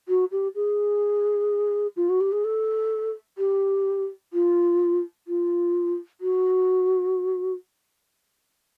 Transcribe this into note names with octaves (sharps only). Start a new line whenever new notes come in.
F#4
G4
G#4
F4
F#4
G4
G#4
A4
G4
F4
F4
F#4